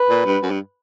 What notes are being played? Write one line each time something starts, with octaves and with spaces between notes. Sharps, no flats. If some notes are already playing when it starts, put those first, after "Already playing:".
Already playing: B4
A#2
G2
F#2
G2